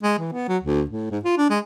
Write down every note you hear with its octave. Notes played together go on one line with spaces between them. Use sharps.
G#3
E3
B3
F#3
D2
A2
G#2
F4
D4
G#3